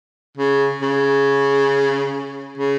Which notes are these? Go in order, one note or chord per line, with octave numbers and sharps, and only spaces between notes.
C#3
C#3
C#3